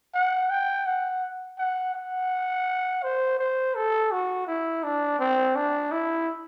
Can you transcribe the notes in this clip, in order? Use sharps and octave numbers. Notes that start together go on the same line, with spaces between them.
F#5
G5
F#5
F#5
F#5
C5
C5
A4
F#4
E4
D4
C4
D4
E4